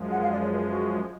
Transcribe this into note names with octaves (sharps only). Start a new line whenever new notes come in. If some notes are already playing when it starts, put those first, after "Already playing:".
Already playing: F#2 F3 G#3
F#5
F5
D5
C#5
B4
G#4
F#4